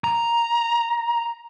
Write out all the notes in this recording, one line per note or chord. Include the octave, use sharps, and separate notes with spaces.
A#5